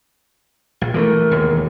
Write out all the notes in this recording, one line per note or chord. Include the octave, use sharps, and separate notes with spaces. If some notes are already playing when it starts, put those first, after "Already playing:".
A#1
E3 F#3 A3 A#4
E1 D#2